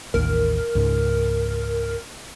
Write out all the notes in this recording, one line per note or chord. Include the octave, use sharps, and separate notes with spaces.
A1 D#2 A#4
C#2 G#2